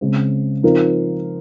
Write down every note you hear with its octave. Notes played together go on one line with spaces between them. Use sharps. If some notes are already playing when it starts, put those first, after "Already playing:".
C#3 G#3 C4
F3 C4 D#4 A#4